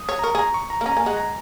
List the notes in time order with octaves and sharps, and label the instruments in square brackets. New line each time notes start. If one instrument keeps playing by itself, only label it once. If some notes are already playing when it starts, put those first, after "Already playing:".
Already playing: [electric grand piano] D#6
[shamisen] C#5
[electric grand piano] A#5
[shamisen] A#4 [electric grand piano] C#6
[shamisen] G#4
[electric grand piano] A#5
C#6
A#5
[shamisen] A#3
[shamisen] C#4 [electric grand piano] A#5
[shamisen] A#3 [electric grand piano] G#5
[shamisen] G#3 [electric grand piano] F#5
[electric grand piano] A#5